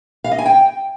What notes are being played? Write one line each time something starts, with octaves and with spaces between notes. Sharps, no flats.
F5
D#5
G#5
G5